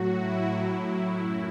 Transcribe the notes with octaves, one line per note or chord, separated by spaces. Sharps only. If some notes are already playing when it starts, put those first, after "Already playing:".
Already playing: A2 F#3 F#4
E4
A2 F#3
F#2